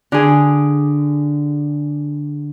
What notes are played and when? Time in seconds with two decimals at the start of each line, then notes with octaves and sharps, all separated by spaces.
0.12 D3 G#4